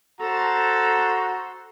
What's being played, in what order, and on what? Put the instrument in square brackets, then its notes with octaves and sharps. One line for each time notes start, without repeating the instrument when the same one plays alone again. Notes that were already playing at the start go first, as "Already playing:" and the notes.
[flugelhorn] F#4 [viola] A4 C5 [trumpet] A#5